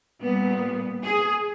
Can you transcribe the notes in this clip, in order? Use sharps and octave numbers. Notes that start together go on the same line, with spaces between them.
A#2 G3 B3
G#4